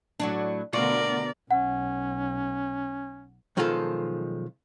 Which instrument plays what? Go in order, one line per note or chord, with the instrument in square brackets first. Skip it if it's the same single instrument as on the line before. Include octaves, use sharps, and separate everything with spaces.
[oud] A2 F#3 D4
[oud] D2 F4 F#4 [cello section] B2 D3 A#4 [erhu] D5
[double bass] B1 [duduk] C#4 [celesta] F#5
[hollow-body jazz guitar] B1 D#3 F3 G#3 F4 A4